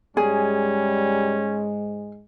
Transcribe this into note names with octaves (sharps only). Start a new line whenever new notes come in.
G#2 G3 G#3 C#4 G#4